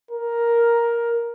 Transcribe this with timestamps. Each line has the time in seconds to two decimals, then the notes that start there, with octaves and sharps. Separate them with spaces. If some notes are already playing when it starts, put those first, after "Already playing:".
0.11 A#4